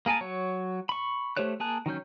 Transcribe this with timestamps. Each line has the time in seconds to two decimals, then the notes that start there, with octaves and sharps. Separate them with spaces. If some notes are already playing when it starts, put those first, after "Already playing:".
0.06 A#3 G#4 A#4 G#5 A5
0.21 F#3 C#5
0.89 B5 C#6
1.37 A3 G4 C5 C#5 F#6
1.60 A#3 G#4 A5 F#6
1.86 D#3 F#3 C#4 G6